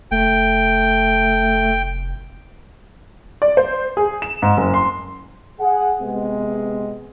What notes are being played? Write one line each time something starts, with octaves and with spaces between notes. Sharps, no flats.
F1 A3 G5
D5
C5
G#4
E7
G#2
F#1
C6
G#4 F#5
C3 G#3 B3